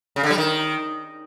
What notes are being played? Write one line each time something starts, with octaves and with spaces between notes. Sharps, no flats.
C#3
D3
G3
D#3